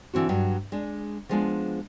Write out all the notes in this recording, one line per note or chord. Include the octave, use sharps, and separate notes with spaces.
D3 E3 C4 F#4
G2 F#3
G#3 D4
F3 G3 G#3 B3 D4 F4